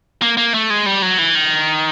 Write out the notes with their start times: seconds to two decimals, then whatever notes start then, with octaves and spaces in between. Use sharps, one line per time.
0.22 A#3
0.37 A#3
0.54 A3
0.70 G#3
0.86 G3
1.02 F#3
1.18 E3
1.35 D#3